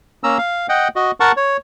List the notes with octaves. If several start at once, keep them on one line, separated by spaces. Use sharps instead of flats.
A#3 C#4 A#5 E6
F5
D#5 F#5 G5
F#4 D#5
A#4 F#5 A5 C#6
C#5